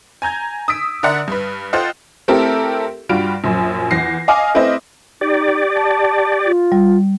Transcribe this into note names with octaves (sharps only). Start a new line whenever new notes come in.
G#5 A#5 G6 G#6
D#6 E6 B6 D7
D3 A#4 D5 E5 F#5
G2 B4
F4 A4 C5 D#5 F#5 G5
A3 C4 E4 G4 A4 A#4
G2 G3 F4 F#4 D7
A#1 F#2
E2 A#6 C7
D#5 F5 G#5 D6 F6
A3 C4 E4 B4 C5 D#5
D#4 G4 D5
A5
F4
G3